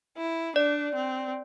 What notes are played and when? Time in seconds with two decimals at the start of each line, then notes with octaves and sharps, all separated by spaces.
0.17 E4
0.56 D4 D5
0.95 C4